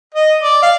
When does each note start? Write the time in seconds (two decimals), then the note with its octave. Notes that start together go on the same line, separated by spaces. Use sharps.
0.14 D#5
0.43 D5
0.63 F5